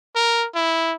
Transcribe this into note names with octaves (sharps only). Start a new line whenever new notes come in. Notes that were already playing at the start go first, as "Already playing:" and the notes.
A#4
E4